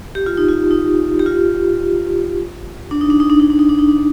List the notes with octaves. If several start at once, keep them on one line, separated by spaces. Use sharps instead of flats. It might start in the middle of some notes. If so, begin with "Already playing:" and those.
G4
F4
D#4
F4
D#4
G4
F4
D4
D#4
D4
D#4
D4
D#4
D4
D#4
D4
D#4
D4